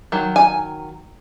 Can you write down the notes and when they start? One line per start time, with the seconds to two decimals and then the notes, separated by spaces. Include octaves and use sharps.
0.12 D#3 F#3
0.36 G#5